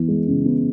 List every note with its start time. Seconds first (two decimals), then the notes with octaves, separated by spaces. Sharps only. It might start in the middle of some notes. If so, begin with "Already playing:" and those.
Already playing: E3 B3
0.08 G#3
0.28 C#3
0.46 B3